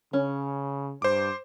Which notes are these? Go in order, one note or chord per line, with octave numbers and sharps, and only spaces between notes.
C#3 C#4
G2 C5 D6